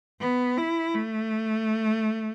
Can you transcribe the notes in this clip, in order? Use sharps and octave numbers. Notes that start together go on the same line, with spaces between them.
B3
E4
A3